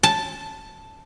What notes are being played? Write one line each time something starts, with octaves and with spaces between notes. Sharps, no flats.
A5